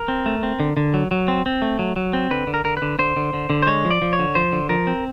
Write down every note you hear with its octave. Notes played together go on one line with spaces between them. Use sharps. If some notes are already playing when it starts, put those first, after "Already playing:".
Already playing: A#4
C4
A3
C4
D3
D3
F#3
F#3
C4
C4
A3
F#3
F#3
C4
D3 B4
D3
A#4
D3 A#4
B4
D3
D3 C5
D3
D3
D3
C5
G#3 C#5
F3
D5
F3
C#5
D3
F3 C5
D3
F3 A#4
C4